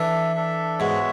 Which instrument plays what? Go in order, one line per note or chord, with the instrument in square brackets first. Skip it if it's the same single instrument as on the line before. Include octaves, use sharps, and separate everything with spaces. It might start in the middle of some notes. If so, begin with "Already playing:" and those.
Already playing: [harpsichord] E3 [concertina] D4 A4 E5
[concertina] D4 A4 E5
[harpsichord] G#2 [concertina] G#3 B3 F#4 C#5 E5